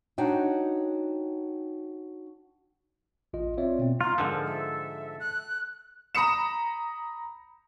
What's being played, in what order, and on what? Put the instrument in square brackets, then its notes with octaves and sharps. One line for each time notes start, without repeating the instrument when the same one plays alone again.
[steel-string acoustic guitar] D4 D#4 F#4 C#5 G5
[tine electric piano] A1 F4 D#5
C4 F4 C#5 D5 E5
B2 B3 C4
[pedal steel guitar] F4 [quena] A#5
[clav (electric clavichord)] G#2 D3 F3 [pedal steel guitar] A4 [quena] A#4
[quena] E5
F#6
[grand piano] A#5 B5 D#6 C#7 E7